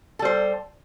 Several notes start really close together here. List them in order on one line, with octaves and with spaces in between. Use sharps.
A4 G3 C5